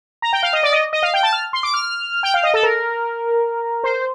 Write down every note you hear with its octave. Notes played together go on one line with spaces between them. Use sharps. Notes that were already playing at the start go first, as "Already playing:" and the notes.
A#5
G5
F5
D#5
D5
D#5
D#5
F5
G5
A5
F6
C6
D6
F6
G5
F5
D#5
A4
A#4
C5